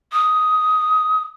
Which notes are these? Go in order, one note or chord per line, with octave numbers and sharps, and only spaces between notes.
D#6